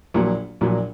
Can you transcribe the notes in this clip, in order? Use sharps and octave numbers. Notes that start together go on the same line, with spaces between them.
A#1 A#2 F#3
A#1 A#2 F#3